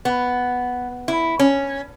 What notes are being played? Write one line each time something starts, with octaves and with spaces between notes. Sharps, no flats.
B3
E4
C#4